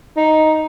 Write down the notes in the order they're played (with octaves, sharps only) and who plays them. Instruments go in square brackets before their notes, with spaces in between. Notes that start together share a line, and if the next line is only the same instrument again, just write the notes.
[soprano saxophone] D#4